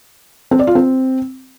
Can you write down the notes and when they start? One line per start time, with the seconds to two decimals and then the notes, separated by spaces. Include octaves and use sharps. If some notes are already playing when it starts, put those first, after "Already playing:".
0.51 C4
0.59 D5
0.67 F4
0.75 C4